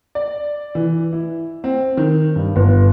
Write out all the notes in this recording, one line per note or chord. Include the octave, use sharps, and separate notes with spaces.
D5
E3
E4
C4
D#3
G2
G1